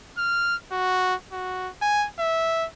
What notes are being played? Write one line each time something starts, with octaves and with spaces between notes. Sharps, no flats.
F6
F#4
F#4
G#5
E5